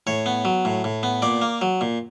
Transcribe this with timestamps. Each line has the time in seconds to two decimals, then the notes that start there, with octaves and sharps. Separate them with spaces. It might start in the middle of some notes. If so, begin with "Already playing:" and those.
0.07 A2 C#5
0.26 B3
0.45 F#3
0.65 A2
0.84 A2
1.03 B3
1.22 A#2 D5
1.42 A#3
1.61 F#3
1.81 A#2